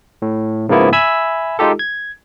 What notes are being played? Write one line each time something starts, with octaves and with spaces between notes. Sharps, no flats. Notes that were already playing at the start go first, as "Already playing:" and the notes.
A2
G#2 C#3 F3 A#3 B3 E4
E5 G#5 B5 E6 G#6
G#3 D#4 F4 G4 A4
G#6